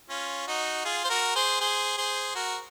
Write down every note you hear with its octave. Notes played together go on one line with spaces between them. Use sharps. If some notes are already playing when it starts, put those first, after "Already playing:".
C#4 F4
D#4 F#4
F4 G#4
C5
F#4 A#4
G#4 C5
G#4 C5
G#4 C5
F#4 A#4